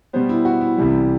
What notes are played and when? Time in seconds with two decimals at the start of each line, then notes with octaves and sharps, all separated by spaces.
0.13 B2 G3 B3 C5
0.29 E4
0.45 F#4
0.61 E4
0.77 C2 C3 E3 G3